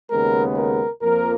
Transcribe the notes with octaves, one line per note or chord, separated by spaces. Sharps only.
D#2 C#3 G#3 B3 A#4
A#4
F2 F3 A#3 A#4